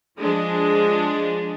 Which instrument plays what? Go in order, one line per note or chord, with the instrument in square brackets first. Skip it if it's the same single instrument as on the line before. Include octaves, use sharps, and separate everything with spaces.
[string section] F3 G#3 D4